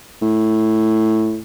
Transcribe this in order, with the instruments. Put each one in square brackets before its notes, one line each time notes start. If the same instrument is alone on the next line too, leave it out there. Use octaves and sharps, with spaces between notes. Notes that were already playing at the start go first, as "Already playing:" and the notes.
[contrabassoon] A2